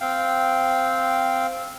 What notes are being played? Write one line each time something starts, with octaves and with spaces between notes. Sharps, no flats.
C4 F5 G5